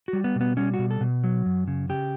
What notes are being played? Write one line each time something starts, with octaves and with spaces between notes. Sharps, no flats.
F#4
G3
B3
B2
B3
G3 C#4
F#4
B2
A4
B2
F#3
F#2
C#3
C#3 G4